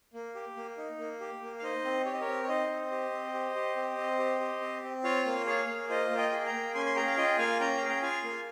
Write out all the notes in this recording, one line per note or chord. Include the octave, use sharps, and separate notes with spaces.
A#3
G4
A#3
D#4
A#3
G4
A#3
F5
D#4 C5 D#5
C4
G4 C#5
D#5
A#4 C#5
C4
C#5
D#4 C5 D#5
C4
G4
C4
G4
G4
C4
C4
G4
G4
C4
C4
F4 C#5 F5
A#3
G#4 C#5 F5
A#3
F4 C5 D#5
A#3
D#5 G5
G#4
G5 A#5
A#3
C#4 G#5 C6
C6
G#4 G5 A#5
F5
F4 D#5 G5
A#3 F5 G#5
C#4 G5 A#5
G#4 F5
G5
F4 F5 G#5
A#3